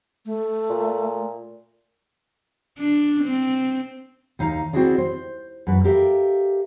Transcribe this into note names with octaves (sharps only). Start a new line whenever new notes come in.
A3
A#2
D4
C4
D#2 D#4 F5 G#5 A#5
C4 C#4 E4 F#4 G#4 D5
C5
F#2 B4
G4 A4 A#4 E5 F5